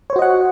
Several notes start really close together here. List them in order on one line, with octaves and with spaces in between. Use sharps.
C#5 C5 F#4 D#5 F#5